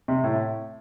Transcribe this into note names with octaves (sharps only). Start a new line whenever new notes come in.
C3
A2